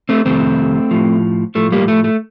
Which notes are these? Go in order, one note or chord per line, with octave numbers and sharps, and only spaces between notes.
A3 C4
F2 C3 D#3 A3 C4
A2 F3
A2 F3 A3
G3 A#3
A3
A3